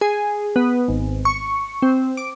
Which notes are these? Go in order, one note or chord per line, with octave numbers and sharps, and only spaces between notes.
G#4
B3
G#1
C#6
C4
D6